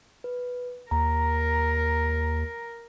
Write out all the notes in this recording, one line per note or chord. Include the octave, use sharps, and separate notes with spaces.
B4
D#2 A#4 A#5